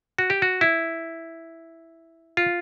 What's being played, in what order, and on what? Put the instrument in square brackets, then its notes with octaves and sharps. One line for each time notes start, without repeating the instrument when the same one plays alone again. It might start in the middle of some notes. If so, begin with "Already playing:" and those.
[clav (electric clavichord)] F#4
G4
F#4
E4
F4